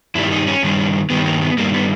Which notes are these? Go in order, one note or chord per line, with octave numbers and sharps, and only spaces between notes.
G2 D#3 G3 E4
D#4
C#4
G2 D#3 G3
G2 D#3 G3 B3
A#3
B3
G2 D#3 G3 A#3
B3